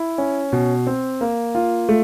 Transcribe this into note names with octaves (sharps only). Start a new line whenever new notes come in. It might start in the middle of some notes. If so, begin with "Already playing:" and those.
Already playing: E4
C#4
B2
C4
A#3
F4
A3